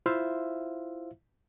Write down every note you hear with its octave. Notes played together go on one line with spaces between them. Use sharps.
E4 F4 C5 E5 F5